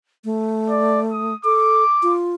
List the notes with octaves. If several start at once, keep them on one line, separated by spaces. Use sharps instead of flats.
A3
D5
D#6
A4 D6
F4